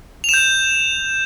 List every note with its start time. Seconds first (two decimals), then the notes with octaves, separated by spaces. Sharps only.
0.24 F7
0.29 E7
0.34 G6